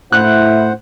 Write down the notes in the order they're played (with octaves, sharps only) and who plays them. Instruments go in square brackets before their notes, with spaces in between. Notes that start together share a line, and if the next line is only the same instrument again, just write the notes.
[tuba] A2 [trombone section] E4 [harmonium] C5 F#5 [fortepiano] F#6